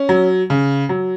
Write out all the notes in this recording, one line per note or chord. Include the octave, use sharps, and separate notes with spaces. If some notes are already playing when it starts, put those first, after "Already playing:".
Already playing: C#4
F#3
C#3
F#3